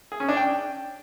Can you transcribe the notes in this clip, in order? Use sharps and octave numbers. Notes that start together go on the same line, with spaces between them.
G#4
C#4
D4
G5